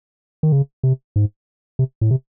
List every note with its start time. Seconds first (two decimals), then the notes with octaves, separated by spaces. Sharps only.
0.43 D#3
0.52 C#3
0.83 C3
1.16 G#2
1.79 C3
2.01 A2
2.11 C3